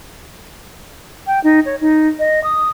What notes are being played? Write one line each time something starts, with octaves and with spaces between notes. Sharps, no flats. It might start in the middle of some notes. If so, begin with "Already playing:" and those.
G5
D#4
C#5
D#4
D#5
D#6